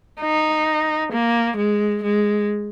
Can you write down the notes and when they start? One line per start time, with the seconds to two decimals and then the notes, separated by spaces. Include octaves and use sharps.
0.21 D#4
1.12 A#3
1.57 G#3
2.03 G#3